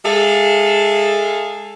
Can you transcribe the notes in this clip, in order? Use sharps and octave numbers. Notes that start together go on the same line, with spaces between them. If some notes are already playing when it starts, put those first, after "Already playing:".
G#3 G#4 A4 E5 F5